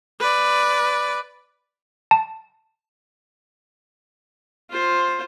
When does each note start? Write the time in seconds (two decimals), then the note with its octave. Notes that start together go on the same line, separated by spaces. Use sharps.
0.20 B4 D5
2.11 A5
4.70 F4 C5